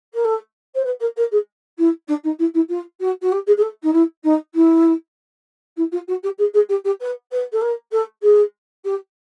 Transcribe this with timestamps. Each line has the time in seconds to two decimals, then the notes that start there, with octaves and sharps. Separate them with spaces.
0.14 A#4
0.24 A4
0.75 C5
0.84 B4
1.00 A#4
1.16 A#4
1.31 G#4
1.78 E4
2.08 D4
2.24 D#4
2.39 E4
2.54 E4
2.69 F4
3.00 F#4
3.22 F#4
3.32 G4
3.47 G#4
3.57 G#4
3.62 A4
3.83 D#4
3.93 E4
4.23 D#4
4.54 E4
5.77 E4
5.92 F4
6.08 F#4
6.23 G4
6.38 G#4
6.54 G#4
6.69 G4
6.84 G4
7.00 B4
7.31 B4
7.52 A4
7.61 A#4
7.92 A4
8.22 G#4
8.84 G4